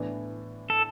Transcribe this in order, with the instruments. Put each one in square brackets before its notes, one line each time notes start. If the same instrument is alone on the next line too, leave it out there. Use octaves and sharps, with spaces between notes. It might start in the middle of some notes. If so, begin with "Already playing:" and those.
Already playing: [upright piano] A2 E3 B3 D4
[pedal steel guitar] A4